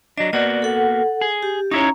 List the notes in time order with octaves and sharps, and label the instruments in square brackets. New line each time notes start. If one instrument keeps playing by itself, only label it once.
[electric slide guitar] F#3 D4 [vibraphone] D#5
[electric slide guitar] A#3 B3 F#4 [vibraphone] D5
[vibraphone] A4 F#5
[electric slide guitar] G#4
[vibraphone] G4
[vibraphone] C#4 A#5 [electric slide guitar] D#4 E4 C#5